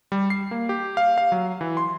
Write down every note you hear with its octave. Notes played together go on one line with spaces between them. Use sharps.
G3
C7
A#3
G4
F5
F5
F#3
E3
C6